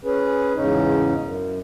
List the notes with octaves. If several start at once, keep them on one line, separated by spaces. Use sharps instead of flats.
C#4 G#4 B4
E2 G#2 C#3 C#4 D#4
F#2